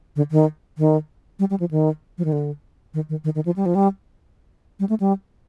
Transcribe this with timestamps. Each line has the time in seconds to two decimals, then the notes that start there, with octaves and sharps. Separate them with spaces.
0.16 D3
0.31 D#3
0.78 D#3
1.39 G3
1.50 G3
1.60 F3
1.71 D#3
2.18 F3
2.25 D#3
2.32 D3
2.94 D#3
3.09 D#3
3.24 D#3
3.35 D#3
3.46 F3
3.56 G3
3.66 F3
3.75 G3
4.80 G3
4.89 A3
5.00 G3